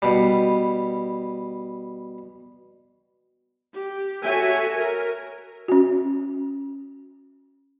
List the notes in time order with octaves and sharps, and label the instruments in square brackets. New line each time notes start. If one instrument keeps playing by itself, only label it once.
[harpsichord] B2 G3
[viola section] G4
F#4 A4 C#5 E5 G#5
A#4
[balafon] C#4 F#4